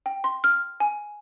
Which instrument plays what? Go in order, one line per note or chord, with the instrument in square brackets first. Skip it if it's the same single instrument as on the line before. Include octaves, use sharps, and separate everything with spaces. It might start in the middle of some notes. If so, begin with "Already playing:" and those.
[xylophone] G5
C6
F6
G#5